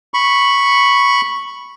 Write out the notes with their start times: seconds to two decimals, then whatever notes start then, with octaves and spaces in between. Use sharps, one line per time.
0.14 B5 C#6